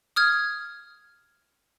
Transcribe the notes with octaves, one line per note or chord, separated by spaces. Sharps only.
D#6 F6 G#6